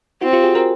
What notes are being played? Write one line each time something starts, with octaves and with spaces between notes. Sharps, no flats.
C4 E4 F#4
F4 G4
F#4 G#4
G#4 A#4